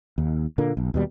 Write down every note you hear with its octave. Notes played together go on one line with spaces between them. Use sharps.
D#2
A#2 D3 A#3
B1
D#2 B2 G3